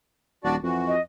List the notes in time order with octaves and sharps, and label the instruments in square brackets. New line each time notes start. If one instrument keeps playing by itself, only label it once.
[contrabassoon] D#1 [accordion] D4 F#4 D5
[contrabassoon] F2 [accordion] E3 F#4
[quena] D#5